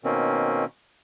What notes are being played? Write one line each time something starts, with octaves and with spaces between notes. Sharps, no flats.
B2 D#3 A#3 C4 C#4